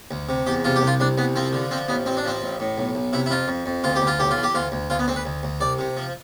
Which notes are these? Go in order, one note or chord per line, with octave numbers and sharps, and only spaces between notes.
D2
C3
E2 G4
C3 F4
G4
C2
F4
C2 D4
C2 B3
F3 C4
D3
F3 C4
A1 B3
A1 C4
D4
F3 C4
A1
A2
B1
B1
C3 E4
E4
F2 F4
F2
F2
D2 F4
G4
D2
F4
B1 G4
F4
E3
G4
D2 F4
D2
D2 F4
B3
D2 C4
B4
D2
D2
C2 D5
C3
F3